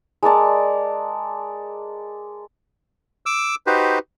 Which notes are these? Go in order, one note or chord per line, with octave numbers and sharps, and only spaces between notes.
G#3 A#4 D5 A5
D6 E6
D#4 F#4 G4 B4 C5